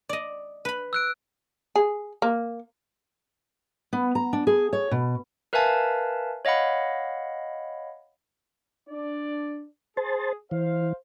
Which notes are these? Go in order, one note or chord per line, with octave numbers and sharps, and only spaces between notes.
D5 D#5
B4 B5
E6 F#6 D7
G#4
A#3
B3
A#5
D4
G#4
C#5
B2
A#4 B4 E5 F5 G#5 A5
C#5 D#5 F5 F#5 B5
D4 D5
G#4 C5 A5
E3 C5 F5